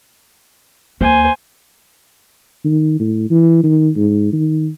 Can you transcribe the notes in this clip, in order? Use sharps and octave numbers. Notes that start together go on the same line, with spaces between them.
D#2 C5 G#5
D#3
A2
E3
D#3
G#2
D#3